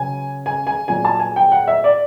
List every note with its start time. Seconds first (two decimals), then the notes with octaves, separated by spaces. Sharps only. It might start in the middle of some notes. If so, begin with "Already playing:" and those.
Already playing: C#3 F#3 G#5
0.46 G#5
0.67 G#5
0.88 A#2 F#3 G#5
1.05 A5
1.19 G#5
1.36 G5
1.52 F#5
1.67 E5
1.84 D5